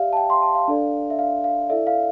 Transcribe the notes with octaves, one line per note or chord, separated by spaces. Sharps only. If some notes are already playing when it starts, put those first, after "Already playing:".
Already playing: G4 D5 E5 F5
A5
G5
C6
A5
F5
D4 A4 D5
E5
F5
F5
E4 A4 D5 E5
F5